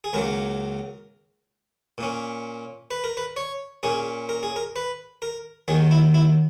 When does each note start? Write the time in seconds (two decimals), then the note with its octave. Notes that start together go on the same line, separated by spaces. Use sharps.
0.04 G#4
0.13 C#2 C#3 F#3 A#3 A#4
1.98 A#2 A#3 C#4
2.91 B4
3.04 A#4
3.17 B4
3.36 C#5
3.83 A#2 A#3 C#4 G#4
4.29 A#4
4.43 G#4
4.56 A#4
4.76 B4
5.22 A#4
5.68 D#2 D#3 F#3 G#4
5.91 E4
6.14 E4